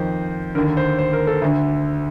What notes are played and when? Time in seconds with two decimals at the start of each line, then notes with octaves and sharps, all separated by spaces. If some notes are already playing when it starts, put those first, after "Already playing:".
Already playing: F2 D#3 C5
0.55 D3 A#4
0.58 D#2
0.77 C5
0.99 C5
1.13 A#4
1.27 A4
1.42 D2 D3